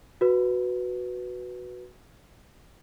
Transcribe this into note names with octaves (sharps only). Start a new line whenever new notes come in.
F#4 B4